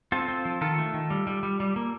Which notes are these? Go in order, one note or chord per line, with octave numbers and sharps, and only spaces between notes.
C4 F4 A4
C4
F3
D#3 F4 A4
A3
D#3
G3
G3
G3
G3
A#3